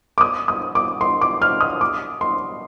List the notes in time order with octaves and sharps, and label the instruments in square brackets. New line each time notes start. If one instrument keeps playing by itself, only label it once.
[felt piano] D6
D#6
D#6
D6
C6
D6
F6
D#6
D6
C6